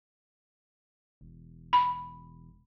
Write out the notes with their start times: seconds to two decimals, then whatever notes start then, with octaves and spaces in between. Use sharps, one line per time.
1.21 E1
1.73 B5